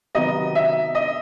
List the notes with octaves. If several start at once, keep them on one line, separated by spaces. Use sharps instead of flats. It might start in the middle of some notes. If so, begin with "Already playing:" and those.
C3 D#3 F#3 B3 D#5
E5
D#5